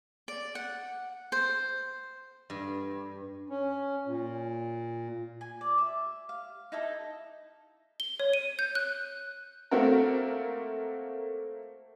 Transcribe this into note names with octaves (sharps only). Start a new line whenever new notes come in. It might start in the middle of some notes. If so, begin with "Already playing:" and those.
D5
F#5
C5
G2
C#4
A#2
G#5
D5
E5
F5
D#4 E4 A4 D#5
G7
C#5
D#7
G6
F#6
A3 A#3 C4 F#4 A#4